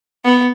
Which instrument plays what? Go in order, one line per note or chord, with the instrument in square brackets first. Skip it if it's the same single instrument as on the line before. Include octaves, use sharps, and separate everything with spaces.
[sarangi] B3